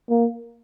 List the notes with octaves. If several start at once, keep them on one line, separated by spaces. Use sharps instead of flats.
A#3